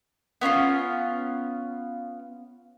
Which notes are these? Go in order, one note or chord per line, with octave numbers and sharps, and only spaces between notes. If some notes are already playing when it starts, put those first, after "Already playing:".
B3 C#4 E4 F4